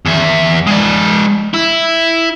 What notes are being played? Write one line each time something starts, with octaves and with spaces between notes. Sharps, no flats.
E2 E5
G#3 D5
E4